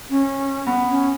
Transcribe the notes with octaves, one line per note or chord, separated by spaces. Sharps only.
C#4
B3
C#4